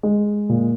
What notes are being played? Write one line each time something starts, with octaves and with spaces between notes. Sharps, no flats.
G#3
A#2